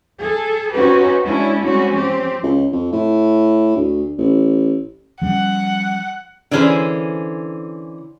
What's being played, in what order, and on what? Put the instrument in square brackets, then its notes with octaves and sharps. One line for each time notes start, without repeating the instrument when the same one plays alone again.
[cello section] G#4 A4
C4 C#4 D#4 F#4 G4 B4
G#3 C#4 D4 E4
G3 G#3 C4 C#4 F#4
F3 C4 G4
[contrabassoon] C#2
F2
A2
D2
A1
[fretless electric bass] F3 G3 C#4 [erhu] F#5
[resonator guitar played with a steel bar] D3 E3 C#4 G#4 C5